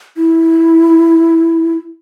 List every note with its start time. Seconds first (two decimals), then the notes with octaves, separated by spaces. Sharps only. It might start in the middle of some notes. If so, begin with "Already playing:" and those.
0.17 E4